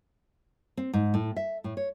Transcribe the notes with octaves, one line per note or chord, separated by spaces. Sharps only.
C4
G#2
A2
E5
A2
C#5